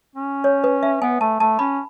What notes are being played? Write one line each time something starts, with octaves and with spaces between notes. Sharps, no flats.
C#4
C#5
B4
E5
B3 G#5
A3 A5
A3 A5
C#4 B5